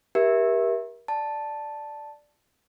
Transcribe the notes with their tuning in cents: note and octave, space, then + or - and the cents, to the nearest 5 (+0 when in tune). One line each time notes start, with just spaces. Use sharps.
G4 +0 A#4 +30 E5 +0
D5 +5 A5 +0